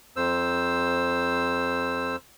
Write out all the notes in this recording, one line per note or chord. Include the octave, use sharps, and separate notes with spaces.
F2 C5 E6